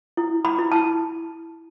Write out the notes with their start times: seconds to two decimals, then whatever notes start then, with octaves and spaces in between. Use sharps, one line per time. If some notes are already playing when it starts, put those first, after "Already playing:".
0.17 E4
0.45 B5
0.59 E4
0.72 A5